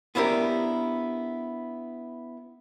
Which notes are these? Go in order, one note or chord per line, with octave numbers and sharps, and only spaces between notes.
B3 C#4 D4 E4 G4 A#4